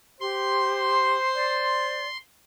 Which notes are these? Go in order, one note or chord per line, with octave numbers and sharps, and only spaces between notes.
G4 C5 C6
D5